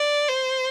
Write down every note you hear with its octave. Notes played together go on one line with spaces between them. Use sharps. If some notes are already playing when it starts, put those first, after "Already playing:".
Already playing: D5
C5